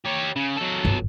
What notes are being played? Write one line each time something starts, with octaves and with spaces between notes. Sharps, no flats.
G4 C#5
C#3
F#3 A4
G1